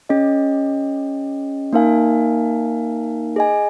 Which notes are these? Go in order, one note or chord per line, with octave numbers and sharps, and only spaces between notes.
C#4 G#4 D#5
A#3 D#4 A#4 F5 G#5
G#4 D#5 G#5